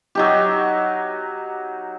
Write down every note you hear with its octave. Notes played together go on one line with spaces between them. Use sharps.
F#3 D#4 G4